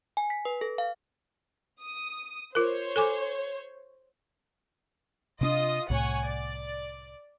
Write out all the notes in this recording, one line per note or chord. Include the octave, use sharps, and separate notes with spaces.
G#5
B6
B4
A4
F5
D#6
F4 A#4 C5 C#5
A4 G#5 D6
C3 C#4 D4 F4 D#5 D#6
C2 A2 C#5 F#5 G#5
D5